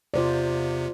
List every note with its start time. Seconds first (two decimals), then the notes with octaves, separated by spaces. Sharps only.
0.14 E2 C3 F4 C5 D5